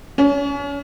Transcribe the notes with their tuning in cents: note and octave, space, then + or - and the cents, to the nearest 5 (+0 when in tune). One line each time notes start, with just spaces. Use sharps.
C#4 +35